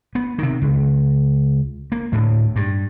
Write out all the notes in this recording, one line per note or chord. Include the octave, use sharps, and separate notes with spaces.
B3
C3 D#3
C#2
A#3
D2 A2
G2